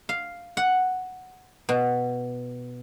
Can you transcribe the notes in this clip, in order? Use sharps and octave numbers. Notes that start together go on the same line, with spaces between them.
F5
F#5
B2